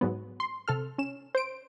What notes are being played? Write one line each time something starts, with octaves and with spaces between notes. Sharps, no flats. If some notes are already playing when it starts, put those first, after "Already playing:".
G#2 F#3 B3
C6
C3 A4 F6
C#4 E7
C5 D7